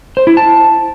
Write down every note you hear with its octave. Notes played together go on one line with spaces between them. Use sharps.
C5
E4
A5